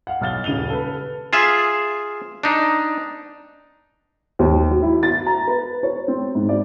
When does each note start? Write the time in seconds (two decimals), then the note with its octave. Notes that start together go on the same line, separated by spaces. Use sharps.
0.07 F5 F#5
0.21 B1 F6 A6 G7
0.44 D#1 C#3 D#7 F7 G7
0.70 A4 B4
1.33 F4 G#4 E5
2.43 D4 D#4
4.39 D#2
4.70 F#3
4.82 E4
5.03 A6
5.26 A#5
5.47 B4
5.83 C#5
6.08 C4
6.35 G#2
6.49 D5